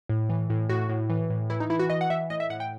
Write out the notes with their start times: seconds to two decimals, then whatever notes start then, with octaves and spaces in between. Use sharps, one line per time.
0.09 A2
0.29 E3
0.50 A2
0.69 A2 F#4
0.89 A2
1.10 E3
1.30 A2
1.50 E3 E4
1.60 D#4
1.70 E3 E4
1.79 F#4
1.90 E3 D#5
2.01 F#5
2.10 E3 E5
2.30 A2 D#5
2.40 E5
2.50 A2 F#5
2.60 G5